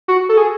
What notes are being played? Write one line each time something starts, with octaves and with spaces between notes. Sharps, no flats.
F#4
A4
G#4